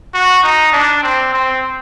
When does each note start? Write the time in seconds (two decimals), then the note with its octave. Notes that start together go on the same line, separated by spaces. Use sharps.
0.14 F#4
0.43 D#4
0.73 D4
1.03 C4
1.33 C4